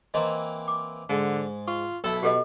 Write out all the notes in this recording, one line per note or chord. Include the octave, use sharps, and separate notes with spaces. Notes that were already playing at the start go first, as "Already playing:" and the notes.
E3 A#3 C4 D#5 A#5
D6
G#2 D3
F4 C#6
B1 E4 A4 B5
B2 G4 A4 D#5